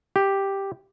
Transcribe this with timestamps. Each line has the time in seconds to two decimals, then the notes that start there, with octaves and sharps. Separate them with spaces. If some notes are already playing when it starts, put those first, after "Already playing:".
0.16 G4